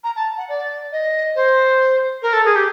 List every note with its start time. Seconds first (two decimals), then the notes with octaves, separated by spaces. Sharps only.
0.04 A#5
0.16 A5
0.38 F#5
0.49 D5
0.92 D#5
1.36 C5
2.22 A#4
2.33 A4
2.45 G#4
2.56 G4